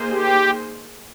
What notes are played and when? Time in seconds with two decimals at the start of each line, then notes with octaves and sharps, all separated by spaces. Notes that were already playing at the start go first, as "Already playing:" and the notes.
Already playing: A#3 D#4 G#4 C5
0.11 G4